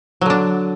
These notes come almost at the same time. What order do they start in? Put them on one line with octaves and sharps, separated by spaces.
F#3 D3 D4